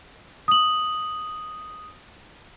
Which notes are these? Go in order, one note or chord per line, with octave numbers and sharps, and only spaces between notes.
D#6 F#7